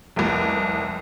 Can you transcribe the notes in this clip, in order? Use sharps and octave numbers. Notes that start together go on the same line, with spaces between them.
F1 C2